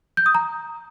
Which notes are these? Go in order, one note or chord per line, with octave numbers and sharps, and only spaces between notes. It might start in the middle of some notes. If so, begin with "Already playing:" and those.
G6
D#6
A#5